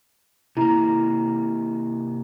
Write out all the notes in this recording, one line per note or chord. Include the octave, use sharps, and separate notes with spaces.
C3 A#3 E4 A#5